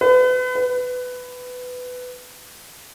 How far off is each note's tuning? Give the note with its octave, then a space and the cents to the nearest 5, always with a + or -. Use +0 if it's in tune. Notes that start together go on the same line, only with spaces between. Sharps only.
B4 +35
B4 +15